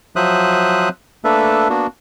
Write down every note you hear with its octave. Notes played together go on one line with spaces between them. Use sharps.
F3 F#3 C5 E5 D#6 F#6
A3 A#3 D4 A4 B4 E5
A#3 B3 D4 F#4